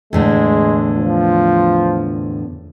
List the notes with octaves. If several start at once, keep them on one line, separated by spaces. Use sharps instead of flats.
E2 A2 D3 G#3
F3